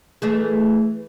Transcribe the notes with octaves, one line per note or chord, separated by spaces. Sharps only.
E3 A3 G#4